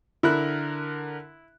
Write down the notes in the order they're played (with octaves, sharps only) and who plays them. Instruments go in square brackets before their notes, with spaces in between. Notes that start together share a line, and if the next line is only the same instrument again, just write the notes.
[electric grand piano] D3 A#4 F#6 [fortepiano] E4